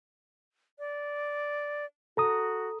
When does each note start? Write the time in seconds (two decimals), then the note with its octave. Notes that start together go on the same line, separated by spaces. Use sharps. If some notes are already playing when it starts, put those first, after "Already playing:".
0.79 D5
2.17 F#4 A4 A#5 D#6